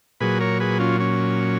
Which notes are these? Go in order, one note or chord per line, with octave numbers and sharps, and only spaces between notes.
A#2 F#3 G#4 B4
A#4 C#5
G#4 B4
C#4 F4
C#4